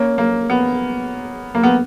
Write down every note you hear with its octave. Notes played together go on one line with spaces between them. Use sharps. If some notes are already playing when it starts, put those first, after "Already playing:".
Already playing: A#3 C#4
A#3
B3
A#3
B3